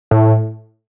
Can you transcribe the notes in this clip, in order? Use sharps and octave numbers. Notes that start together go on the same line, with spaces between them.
A2